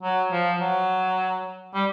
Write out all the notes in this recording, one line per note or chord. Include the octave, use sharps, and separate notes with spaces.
F#3
F3
F#3
G3